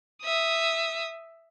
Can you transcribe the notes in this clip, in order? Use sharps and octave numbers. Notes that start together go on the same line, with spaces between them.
E5 D#6